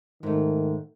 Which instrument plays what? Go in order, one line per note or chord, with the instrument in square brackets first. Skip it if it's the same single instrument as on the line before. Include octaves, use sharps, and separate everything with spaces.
[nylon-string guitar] G#2 A3 [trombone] D#3